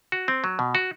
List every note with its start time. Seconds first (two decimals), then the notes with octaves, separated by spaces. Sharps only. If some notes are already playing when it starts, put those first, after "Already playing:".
0.12 F#4
0.28 C4
0.44 F#3
0.59 B2
0.75 F#4